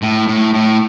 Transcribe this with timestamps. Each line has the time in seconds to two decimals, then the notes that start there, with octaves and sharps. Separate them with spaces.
0.02 A2
0.28 A2
0.54 A2